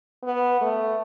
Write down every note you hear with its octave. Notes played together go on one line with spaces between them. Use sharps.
B3
A3